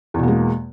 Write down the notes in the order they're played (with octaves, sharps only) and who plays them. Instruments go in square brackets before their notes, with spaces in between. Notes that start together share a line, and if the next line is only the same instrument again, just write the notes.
[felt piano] E2
B2
A#3
G#3